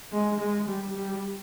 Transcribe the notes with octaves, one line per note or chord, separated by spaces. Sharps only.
G#3
G#3
G3
G3